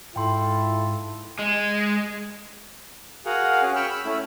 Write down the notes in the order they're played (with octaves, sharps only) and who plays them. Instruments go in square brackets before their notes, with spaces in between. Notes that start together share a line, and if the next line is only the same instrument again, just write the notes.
[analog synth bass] G#2 [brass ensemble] E4 F4 A4 [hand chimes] G5 C6
[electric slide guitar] G#3
[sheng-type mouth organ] F#4 G#4 A#4 F5 F#5
C#4 G#4
G5 B5 C#6 E6 F6
B5 E6
A3 C#4 E4